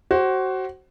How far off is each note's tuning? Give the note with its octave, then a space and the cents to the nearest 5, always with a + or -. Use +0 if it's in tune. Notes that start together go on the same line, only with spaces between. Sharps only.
F#4 +25 C5 +25